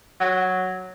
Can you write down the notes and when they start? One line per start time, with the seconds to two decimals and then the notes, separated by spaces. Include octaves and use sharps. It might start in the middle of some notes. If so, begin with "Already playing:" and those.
0.20 F#3